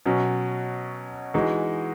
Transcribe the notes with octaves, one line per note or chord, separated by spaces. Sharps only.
B2 F#3 C#4
E3 G#3 D#4 F#4